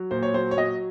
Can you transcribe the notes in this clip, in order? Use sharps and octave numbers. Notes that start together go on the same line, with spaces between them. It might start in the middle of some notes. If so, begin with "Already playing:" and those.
Already playing: F#3
A#2 C5
C#5
F#3 C5
C#5
F#3 D#5